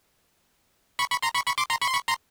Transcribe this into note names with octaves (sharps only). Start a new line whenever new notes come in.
B5 C#6
B5 C#6
A#5 C6
B5 C#6
B5 C#6
C6 D6
A#5 C6
B5 C#6
C6
B5 C#6
A#5 C6